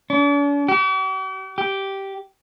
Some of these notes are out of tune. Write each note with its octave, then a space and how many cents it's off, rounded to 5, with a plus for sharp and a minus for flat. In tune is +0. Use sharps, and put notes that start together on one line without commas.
D4 -45
G4 -45
G4 -10